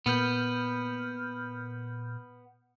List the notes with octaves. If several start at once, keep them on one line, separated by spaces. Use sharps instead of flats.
A#2 B3 F6 G6